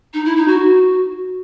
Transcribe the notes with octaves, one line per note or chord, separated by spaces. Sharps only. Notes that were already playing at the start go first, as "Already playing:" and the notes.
D#4
E4
D#4
F#4